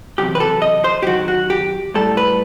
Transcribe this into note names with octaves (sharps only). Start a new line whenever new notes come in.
E2 C3 D#3 F#3 G4
B4
A4
D#5
C5
G4
F#2 D#3 F#3 F#4
F#4
G4
A2 G3 A4
B4